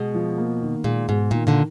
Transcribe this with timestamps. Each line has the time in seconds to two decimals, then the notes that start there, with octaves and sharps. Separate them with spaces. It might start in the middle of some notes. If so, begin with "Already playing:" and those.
Already playing: B2 G#3
0.15 F3
0.38 A#3
0.62 D#3
0.84 A#2 G#3
1.08 G#2 B2
1.31 A#2 D#3
1.47 A#2 D3